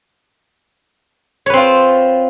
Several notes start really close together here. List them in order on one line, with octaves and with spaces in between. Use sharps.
C#5 B4 C4 F4